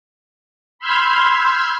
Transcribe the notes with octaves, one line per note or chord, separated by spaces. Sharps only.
B5 C6 E6 F6 G6 G#6